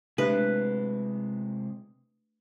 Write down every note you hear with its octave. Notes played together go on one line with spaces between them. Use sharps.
C3 G#3 A3 D4 G4 B4